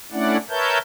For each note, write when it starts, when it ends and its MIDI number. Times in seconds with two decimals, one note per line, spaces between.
0.12 0.37 57
0.12 0.37 61
0.12 0.37 62
0.12 0.37 64
0.12 0.37 74
0.12 0.37 78
0.49 0.78 70
0.49 0.78 71
0.49 0.78 73
0.49 0.78 76
0.49 0.78 81
0.49 0.78 91